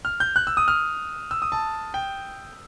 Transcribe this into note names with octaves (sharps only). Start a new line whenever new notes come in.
F6
G6
F#6
E6
D#6
F6
E6
D#6
A5
G5